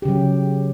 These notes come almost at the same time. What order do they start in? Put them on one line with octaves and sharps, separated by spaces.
G4 C#3 F#3